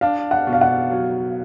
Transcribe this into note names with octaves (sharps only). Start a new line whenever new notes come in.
D4 F5
F#5
B2
F5
F#5
F#3